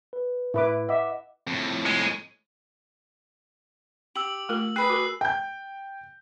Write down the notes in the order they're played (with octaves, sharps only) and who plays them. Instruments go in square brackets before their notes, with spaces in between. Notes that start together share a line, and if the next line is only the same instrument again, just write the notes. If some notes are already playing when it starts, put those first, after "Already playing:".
[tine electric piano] B4
[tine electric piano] A2 [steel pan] E4 B4 D6
[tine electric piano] D#5 F#5 D6 [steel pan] E5
[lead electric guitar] F2 A2
[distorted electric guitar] G#3
[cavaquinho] G4 [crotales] E6 F#7
[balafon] A3 F4 A#4
[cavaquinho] G#4 B4 D#6 [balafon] G5 [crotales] F#6 C7
[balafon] F#4 A#4
[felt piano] G5 G6